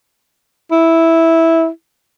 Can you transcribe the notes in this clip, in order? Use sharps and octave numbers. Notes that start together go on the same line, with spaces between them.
E4